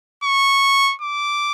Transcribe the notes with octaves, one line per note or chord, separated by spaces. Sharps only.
C#6
D6